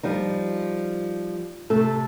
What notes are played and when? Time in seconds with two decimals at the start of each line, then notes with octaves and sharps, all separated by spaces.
0.03 F3 G3 D#4
1.70 C3 A3 A4